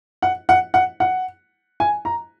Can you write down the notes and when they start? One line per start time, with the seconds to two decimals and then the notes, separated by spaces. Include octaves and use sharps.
0.22 F#5
0.49 F#5
0.74 F#5
1.00 F#5
1.80 G#5
2.05 A#5